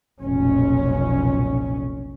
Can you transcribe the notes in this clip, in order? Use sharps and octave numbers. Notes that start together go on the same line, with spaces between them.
F1 B1 A#2 C#4